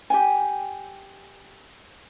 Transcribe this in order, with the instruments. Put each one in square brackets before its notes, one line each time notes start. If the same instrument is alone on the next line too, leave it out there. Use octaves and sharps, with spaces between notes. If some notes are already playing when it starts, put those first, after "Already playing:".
[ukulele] G4 G5 G#5